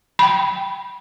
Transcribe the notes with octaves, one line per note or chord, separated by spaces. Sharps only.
G5 B5